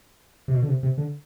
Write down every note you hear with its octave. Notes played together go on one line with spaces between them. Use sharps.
C3
B2
D3
C3
C3
D3